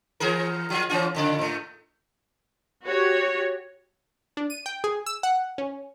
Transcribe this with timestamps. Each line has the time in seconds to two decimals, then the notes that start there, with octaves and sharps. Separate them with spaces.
0.20 E3 G#4 A#4
0.70 F3 F4
0.89 E3 C#4 F4
1.15 F2 C#3 D5
1.39 A2 A3
2.83 F#4 G4 C#5
4.37 D4
4.50 D#7
4.66 G5
4.84 G#4
5.06 E6
5.23 F#5
5.58 C#4